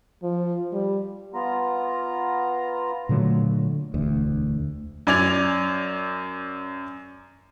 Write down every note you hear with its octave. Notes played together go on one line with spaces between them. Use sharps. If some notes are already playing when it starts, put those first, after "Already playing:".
F3
G3
B3 F4 A#5
A#2 D3 F#3 A3
E1 D2
F#2 D5 G#6 F7